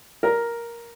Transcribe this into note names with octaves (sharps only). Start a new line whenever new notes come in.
A#4